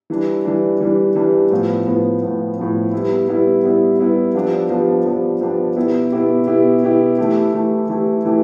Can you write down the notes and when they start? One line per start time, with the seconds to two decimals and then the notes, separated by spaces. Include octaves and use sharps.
0.10 E3 G3 D4
0.45 E3 G3 D4
0.80 E3 G3 D4
1.15 E3 G3 D4
1.51 A2 F3 B3
1.87 A2 F3 B3
2.22 A2 F3 B3
2.58 A2 F3 B3
2.93 G3 B3 E4
3.29 G3 B3 E4
3.63 G3 B3 E4
3.99 G3 B3 E4
4.34 F3 B3 D4 G4
4.70 F3 B3 D4 G4
5.05 F3 B3 D4 G4
5.41 F3 B3 D4 G4
5.76 B2 B3 E4 G4
6.12 B2 B3 E4 G4
6.47 B2 B3 E4 G4
6.83 B2 B3 E4 G4
7.18 E3 A3 E4 G4
7.53 E3 A3 E4 G4
7.89 E3 A3 E4 G4
8.25 E3 A3 E4 G4